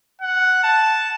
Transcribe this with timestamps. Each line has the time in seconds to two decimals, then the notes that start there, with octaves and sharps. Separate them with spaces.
0.21 F#5
0.63 A5